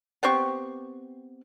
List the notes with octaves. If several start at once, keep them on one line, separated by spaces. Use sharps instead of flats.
B3 C4 G4 C#6